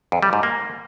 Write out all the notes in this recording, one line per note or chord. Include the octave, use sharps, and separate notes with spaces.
F2
G3
G#2
A#3